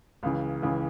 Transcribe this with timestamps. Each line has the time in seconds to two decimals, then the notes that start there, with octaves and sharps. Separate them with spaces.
0.23 C#2 C#3 E3
0.62 C#2 C#3 E3